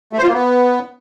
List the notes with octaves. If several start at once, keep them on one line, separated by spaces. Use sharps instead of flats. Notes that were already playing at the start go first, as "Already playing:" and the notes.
A3
C5
F4
A#3
B3